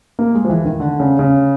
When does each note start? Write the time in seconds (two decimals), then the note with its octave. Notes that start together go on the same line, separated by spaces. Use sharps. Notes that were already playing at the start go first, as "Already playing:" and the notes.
0.19 A#3
0.35 G#3
0.45 F3
0.50 E3
0.65 D#3
0.80 D3
1.00 C#3
1.19 C#3